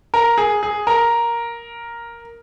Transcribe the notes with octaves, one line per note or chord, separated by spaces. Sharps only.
A#4
G#4
G#4
A#4